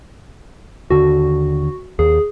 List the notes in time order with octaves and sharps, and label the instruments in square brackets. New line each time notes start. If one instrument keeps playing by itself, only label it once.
[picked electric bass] D#2 D3 [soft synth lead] F#4
[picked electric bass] D#2 [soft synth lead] G#4